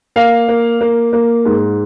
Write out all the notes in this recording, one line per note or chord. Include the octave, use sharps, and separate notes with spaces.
A#3 F5
A#3
A#3
A#3
G#2